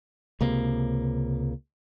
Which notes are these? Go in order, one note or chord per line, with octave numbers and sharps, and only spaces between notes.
C#2 C3 A#3